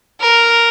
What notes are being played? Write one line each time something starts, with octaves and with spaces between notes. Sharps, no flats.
A#4